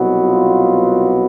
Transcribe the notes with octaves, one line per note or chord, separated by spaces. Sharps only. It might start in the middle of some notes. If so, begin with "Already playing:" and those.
Already playing: C2 B2 F#3 B3
F4